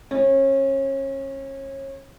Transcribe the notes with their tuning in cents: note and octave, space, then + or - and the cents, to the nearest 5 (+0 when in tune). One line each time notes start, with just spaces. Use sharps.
C#4 -30